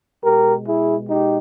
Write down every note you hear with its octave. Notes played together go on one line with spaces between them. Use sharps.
B2 G#3 G4 A#4
E4 G#4
D#4 G4